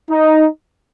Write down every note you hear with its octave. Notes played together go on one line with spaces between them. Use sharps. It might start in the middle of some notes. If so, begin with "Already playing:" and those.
D#4